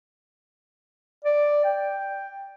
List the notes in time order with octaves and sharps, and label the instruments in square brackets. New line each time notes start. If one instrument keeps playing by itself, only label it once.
[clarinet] D5
G5